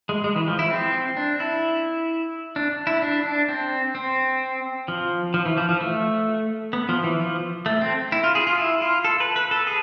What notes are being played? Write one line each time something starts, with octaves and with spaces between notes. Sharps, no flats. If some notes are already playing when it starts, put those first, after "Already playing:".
G#3
G#3
E3
F3
E4
C4
D4
E4
D4
E4
D4
D4
C4
C4
F3
F3
E3
F3
F3
A3
B3
F3
E3
F3
A3
C4
E4
F4
G#4
F4
E4
F4
A4
B4
B4
A4
G#4